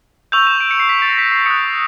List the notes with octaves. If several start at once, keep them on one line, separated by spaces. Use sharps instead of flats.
C#6 E6 G6 F7
E7
D7
C#7
C7
B6
A6
A#6
B6
C7
D#6 F#6 C#7